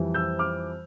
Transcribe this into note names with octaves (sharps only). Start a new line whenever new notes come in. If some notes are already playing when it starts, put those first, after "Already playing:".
Already playing: F2 E3 G3
E6 G6
D6 F6